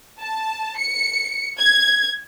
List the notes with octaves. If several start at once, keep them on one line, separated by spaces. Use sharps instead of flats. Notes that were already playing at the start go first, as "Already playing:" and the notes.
A5
C#7
G#6